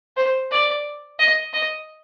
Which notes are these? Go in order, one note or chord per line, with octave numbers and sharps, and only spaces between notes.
C5
D5
D#5
D#5